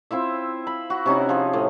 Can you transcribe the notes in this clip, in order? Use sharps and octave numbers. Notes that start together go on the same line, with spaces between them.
C4 E4 F4 E5
B5
F#4
C3 C#4 D#4 E4
F3 G#4
A2